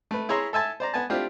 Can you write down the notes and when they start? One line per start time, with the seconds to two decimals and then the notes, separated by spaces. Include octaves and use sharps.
0.11 A3 B4
0.29 E4 G#4 C#5 E5 A#5 C6
0.53 A4 E5 G#5 A5
0.80 C5 D5 A#5
0.94 B3 G#5 A5
1.10 A3 C4 D4 E4 F4 G4